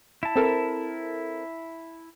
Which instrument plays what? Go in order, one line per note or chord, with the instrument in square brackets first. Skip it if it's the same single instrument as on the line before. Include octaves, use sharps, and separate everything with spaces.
[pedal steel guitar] E4 A5
[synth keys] C4 A4 A#4